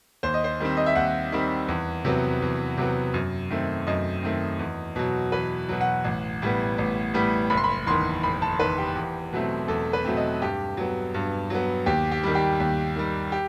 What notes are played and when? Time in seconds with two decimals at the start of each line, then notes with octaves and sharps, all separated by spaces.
0.23 D#2 C5
0.34 D#5
0.44 C5
0.60 D#3 G3 C4
0.77 D#5
0.86 E5
0.95 D#2 F#5
1.32 D#3 G3 C4
1.68 E2
2.05 C3 F#3 B3
2.42 E2
2.77 C3 F#3 B3
3.14 F#2
3.50 D#3 A3 C4
3.87 F#2 D#5
4.23 D#3 A3 C4
4.59 E2
4.96 B2 F#3
5.32 E2 B4
5.69 B2 F#3
5.81 F#5
6.04 A1
6.42 A2 G3 B3
6.78 A1
7.14 A2 G3 B3
7.50 F#1 B5
7.57 C6
7.64 B5
7.87 E2 D#3 C6
8.23 F#1 B5
8.42 A5
8.59 E2 D#3 B4
8.78 G4
8.95 E2
9.33 B2 F#3 A3 C4
9.68 E2 A4
9.93 B4
10.05 B2 F#3 A3 C4
10.17 D#5
10.42 G2 G4
10.77 F#3 B3
11.14 G2
11.50 F#3 B3
11.86 D#2 G4
12.12 G4
12.23 D#3 G3
12.35 G4
12.60 D#2
12.96 D#3 G3
13.32 G4